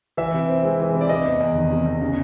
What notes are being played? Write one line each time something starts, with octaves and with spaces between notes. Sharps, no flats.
E3 E5
C3
C4
G#3
E3
C3
D5
C3 D#5
E2
E2
D#3
C3
E2
C#3